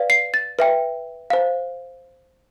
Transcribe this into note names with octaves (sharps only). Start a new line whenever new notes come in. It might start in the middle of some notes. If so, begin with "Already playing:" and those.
Already playing: B4 D5 F5
C7
A6
B4 E5 G5
C5 F5